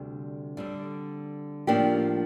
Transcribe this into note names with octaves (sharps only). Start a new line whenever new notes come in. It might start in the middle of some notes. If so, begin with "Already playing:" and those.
Already playing: D2 C3 G3 D4
D3 G3 C4
A2 F3 A#3 D4 G4